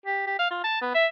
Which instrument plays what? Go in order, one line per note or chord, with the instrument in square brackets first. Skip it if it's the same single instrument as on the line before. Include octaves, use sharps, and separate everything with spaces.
[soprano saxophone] G4
G4
F5
F4
A5
B3
E5